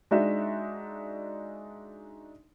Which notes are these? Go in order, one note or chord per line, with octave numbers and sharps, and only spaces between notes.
G#3 D4 D#4 F#4 D#5 E5